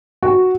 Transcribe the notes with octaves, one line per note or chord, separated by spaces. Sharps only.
F#4